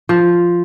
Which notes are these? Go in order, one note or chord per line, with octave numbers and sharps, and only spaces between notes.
F3